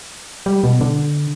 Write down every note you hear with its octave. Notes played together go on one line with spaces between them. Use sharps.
G3
B2
D3